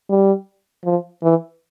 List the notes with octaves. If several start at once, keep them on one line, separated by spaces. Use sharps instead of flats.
G3
F3
E3